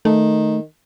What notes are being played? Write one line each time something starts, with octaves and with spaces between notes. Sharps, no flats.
D#3 A3